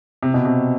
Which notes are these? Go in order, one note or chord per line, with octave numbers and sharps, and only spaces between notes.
C3
B2
C3